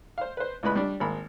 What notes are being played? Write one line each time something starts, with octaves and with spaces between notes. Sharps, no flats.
C5 F5
B4 C5
C#2 A2 G#3 B4 B5
G3 D4
G#1 A#3 B5